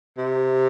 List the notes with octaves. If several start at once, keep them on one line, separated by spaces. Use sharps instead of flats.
C3